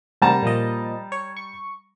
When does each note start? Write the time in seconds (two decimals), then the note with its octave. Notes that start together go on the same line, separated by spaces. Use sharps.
0.22 C3 G3 A5 A#5
0.43 A#2 F3 D#5
1.12 C#5
1.37 C#6